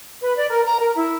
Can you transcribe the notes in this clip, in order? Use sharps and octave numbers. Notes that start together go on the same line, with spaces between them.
B4
D5
A#4
A#5
A#4
E4